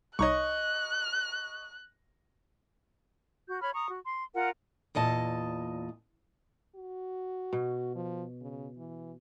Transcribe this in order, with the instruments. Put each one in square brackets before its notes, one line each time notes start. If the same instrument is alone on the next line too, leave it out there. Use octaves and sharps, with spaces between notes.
[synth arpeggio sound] C2 D#4 C#5 [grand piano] D#5 C#6 [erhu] F#6
[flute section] F#4 G6
C#5 B5 F6
A#5 C#6 D#6
F#4
C6
F4 A#4 F#5
[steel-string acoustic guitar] E2 A#2 D#5 A5
[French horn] F#4
[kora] B2
[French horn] F3
C#3
E3